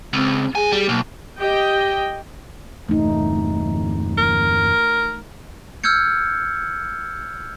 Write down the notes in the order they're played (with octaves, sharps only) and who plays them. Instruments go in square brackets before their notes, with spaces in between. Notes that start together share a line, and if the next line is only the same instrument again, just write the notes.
[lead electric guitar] C#2 [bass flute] C4
[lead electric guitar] G2 G#5 [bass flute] G#4
[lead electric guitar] G3
[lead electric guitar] B1 [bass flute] A#3
[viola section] G4 D#5 G5
[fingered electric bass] G1 E2 [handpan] A3 D#4
[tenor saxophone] A#4
[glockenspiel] E6 F6 G6 G#6 C#7